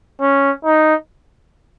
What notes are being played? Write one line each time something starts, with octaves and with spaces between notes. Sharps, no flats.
C#4
D#4